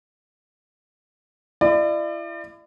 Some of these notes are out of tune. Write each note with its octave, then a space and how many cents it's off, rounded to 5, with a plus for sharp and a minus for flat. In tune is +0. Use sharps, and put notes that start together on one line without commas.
E4 +35 D5 +35